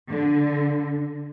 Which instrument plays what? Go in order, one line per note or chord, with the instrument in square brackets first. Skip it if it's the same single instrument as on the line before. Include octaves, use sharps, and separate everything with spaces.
[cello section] D3